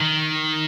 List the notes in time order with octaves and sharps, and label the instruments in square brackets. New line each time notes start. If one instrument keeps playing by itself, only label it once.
[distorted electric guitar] D#3